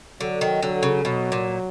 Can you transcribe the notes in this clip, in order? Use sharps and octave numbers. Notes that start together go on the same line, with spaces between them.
D3 F#3
D#3
D3 F#3
C#3
B2 F#3
A#2